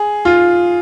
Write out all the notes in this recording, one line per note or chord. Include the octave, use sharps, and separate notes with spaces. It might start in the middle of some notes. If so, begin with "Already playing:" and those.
Already playing: G#4
F4